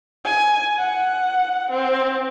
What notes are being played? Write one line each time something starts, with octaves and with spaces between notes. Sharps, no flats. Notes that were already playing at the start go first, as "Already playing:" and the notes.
G#5
F#5
C4